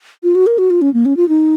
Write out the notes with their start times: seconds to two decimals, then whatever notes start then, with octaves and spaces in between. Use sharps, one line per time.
0.23 F4
0.35 F#4
0.47 A#4
0.58 F#4
0.70 F4
0.82 C#4
0.94 A#3
1.05 C#4
1.17 F4
1.29 D#4